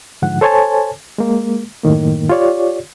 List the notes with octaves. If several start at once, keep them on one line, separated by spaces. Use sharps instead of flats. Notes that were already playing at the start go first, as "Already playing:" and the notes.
G#2 D3 F3 F#5
A4 C5 C#5 G#5 A5
G#3 A#3
F#2 A2 D#3 A#3
F4 G4 C#5 D5